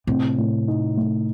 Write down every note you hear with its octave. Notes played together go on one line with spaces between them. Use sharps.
A2 C3
A2
D#4
A3